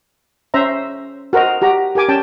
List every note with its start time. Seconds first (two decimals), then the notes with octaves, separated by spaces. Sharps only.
0.54 C#4 C5 E5 A#5
1.33 F#4 A#4 C5 D#5
1.62 F#4 G4 A#5
1.95 G4 A#4 G#5 D6
2.09 C#4 G5 A5